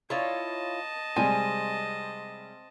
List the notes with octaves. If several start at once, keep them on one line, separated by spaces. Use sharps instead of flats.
E4 F4 C#5 D#5 A5
C3 G3 G#3 C4 G#5